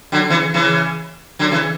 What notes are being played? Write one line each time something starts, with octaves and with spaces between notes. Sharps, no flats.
D3 F#3
C#3 E3
C#3 E3
D3 F#3
C#3 E3